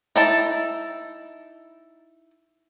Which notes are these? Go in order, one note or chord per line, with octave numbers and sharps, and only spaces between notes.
D#4 E4 A5